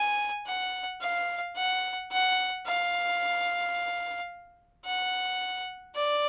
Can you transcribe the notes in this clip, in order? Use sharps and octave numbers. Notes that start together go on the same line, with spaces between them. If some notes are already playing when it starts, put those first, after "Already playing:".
Already playing: G#5
F#5
F5
F#5
F#5
F5
F#5
D5